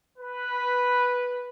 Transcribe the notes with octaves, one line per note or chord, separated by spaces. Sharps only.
B4